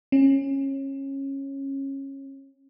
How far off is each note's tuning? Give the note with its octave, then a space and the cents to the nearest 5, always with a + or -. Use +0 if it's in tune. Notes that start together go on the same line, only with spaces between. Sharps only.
C#4 -20